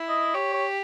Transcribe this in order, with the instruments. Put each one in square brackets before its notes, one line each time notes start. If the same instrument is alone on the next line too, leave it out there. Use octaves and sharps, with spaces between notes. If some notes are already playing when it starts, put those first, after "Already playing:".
Already playing: [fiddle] E4
[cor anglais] D#5
[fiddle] G4 [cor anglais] C#5
[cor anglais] C#5